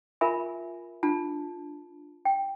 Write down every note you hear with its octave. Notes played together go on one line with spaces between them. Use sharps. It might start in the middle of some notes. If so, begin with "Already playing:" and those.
F4 A#4 E5 G#5 B5
D4 F4 A5
G5